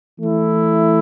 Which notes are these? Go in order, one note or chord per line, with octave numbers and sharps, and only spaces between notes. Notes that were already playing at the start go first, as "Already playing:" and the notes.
E3 A3 E4